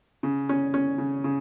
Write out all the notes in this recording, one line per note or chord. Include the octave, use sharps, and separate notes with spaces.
C#3
C#4
C#4
C#3
C#3